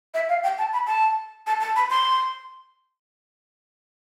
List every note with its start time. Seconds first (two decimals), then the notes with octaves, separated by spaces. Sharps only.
0.14 E5
0.29 F5
0.43 G5
0.58 A5
0.73 B5
0.87 A5
1.47 A5
1.60 A5
1.76 B5
1.90 C6